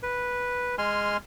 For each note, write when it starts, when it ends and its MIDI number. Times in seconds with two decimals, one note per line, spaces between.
0.03 0.75 71
0.78 1.17 56
0.78 1.17 80
0.78 1.17 84
0.78 1.17 89